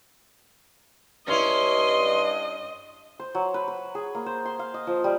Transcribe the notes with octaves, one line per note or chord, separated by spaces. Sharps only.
G2 C#4 E4 D#5 C6
C5
F#3
B4
B4
G#4
A#3
C5
C6
F5
D#5
F3
G3